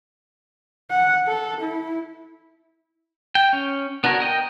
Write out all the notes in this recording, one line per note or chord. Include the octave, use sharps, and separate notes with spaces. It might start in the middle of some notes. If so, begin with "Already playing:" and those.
F#5
A4
E4
G5
C#4
B3 D4 F#4 A#4 C#5
A#4 D#5 G5